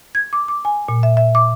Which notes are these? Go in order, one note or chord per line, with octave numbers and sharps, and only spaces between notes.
G#6
D6
D6
G#5
A#2
E5
E5
D6